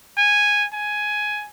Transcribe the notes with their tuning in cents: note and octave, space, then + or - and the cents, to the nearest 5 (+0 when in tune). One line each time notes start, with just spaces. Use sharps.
G#5 -5
G#5 +10